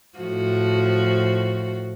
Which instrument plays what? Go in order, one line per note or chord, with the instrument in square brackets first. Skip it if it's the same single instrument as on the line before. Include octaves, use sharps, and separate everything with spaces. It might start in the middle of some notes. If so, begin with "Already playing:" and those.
[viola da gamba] A2 F3 F#4